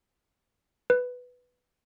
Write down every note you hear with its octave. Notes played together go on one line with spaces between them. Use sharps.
B4